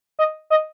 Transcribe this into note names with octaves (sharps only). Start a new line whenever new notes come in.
D#5
D#5